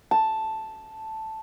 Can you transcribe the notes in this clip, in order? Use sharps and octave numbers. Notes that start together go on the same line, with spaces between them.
A5